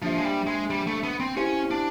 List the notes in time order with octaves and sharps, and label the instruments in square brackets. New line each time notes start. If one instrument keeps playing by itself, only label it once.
[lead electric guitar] F3 [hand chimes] A#3 D4 G4 C5 E5
[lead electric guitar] G#3
G3
G#3
G3
A3
B3
C4
[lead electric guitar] C#4 [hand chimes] E4 G4 C5 F5
[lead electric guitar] D4